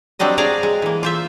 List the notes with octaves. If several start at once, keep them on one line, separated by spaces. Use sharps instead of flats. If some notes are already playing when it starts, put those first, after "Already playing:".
F#3 G3 C4 D4 D#5
D4 G#4 D5 F5 A#5
G#3
E3 A#3
F4 C5 E5